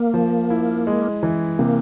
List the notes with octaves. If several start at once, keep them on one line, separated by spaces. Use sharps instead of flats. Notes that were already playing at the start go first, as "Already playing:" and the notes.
Already playing: A#3
F3
E4
G#3
E3
C3 A#3